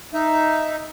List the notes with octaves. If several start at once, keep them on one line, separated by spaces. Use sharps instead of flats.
D#4 E5